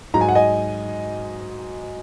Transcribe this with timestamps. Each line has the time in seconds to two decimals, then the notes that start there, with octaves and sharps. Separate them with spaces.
0.14 G#2 F#3 A#5
0.21 G#5
0.29 F#5
0.35 D#5 G#5